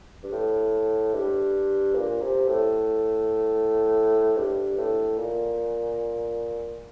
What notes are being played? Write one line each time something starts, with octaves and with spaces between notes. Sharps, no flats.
G2
A2
G2
A#2
C3
A2
G2
A2
A#2